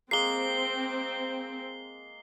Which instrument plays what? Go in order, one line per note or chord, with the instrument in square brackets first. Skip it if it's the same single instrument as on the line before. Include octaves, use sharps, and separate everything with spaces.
[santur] G#3 A#3 [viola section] C4 [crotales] C7 G7